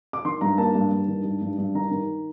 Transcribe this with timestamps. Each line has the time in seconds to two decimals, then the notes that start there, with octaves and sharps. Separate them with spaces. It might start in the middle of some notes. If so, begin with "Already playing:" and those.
0.13 D6
0.25 D#3 C6
0.41 G2 A#5
0.58 A#3 A5
0.75 G2
0.92 G2
1.08 D#3
1.24 G2
1.42 G2
1.58 G2
1.75 D#3 A#5
1.91 D#3